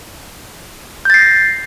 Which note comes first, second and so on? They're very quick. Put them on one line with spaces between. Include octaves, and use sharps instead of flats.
G6 A6 C7 A#6